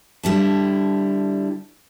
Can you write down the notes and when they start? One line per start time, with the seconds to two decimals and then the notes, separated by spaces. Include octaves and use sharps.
0.23 D3 G3 E4 A5